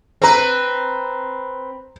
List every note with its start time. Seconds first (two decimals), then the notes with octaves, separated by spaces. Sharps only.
0.22 C4 B4 C5 A#5